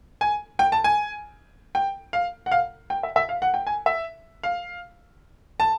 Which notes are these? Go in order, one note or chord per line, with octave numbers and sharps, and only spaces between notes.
G#5
G5
A5
G#5
G5
F5
F#5
F5
G5
E5
E5
F5
F#5
G5
G#5
E5
F5
A5